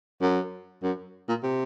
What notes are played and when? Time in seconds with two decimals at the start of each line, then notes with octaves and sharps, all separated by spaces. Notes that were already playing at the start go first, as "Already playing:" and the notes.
0.21 F#2
0.82 F#2
1.29 A#2
1.43 C3